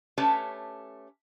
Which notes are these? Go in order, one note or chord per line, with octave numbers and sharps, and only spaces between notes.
A3 C#4 G4 B4 C#5 A5